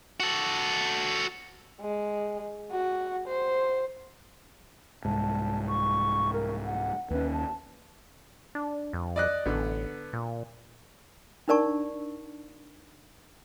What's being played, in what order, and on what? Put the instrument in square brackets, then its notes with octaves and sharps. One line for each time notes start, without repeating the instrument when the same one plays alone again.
[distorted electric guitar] F#4 A4
[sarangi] G#3
F#4
C5
[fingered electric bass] C2 G#2 [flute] A5
[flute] C#6
A#4
F#5
[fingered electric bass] D#2 C#4 [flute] B4
[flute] A5
[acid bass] D4
F2
[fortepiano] D5 D#5 F#6
[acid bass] A1 [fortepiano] D3 B3
[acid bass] A#2
[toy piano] D4 D#4 A#4 D5 A5 C#6